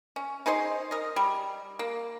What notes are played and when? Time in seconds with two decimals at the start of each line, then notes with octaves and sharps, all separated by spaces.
0.16 C#4
0.46 D#4 G#4 C5 C6
0.91 A#4 D#5
1.16 G3
1.79 A#3